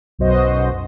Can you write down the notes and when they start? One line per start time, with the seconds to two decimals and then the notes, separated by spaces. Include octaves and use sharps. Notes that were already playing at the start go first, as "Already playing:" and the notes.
0.19 B1 F#2 B2 F#4 C5 D#5